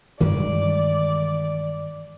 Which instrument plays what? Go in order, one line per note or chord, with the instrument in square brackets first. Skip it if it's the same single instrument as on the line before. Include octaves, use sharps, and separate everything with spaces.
[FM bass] G2 [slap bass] D#3 E3 G#3 [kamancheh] D5